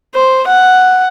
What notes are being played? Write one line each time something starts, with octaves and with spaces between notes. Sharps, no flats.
C5
F#5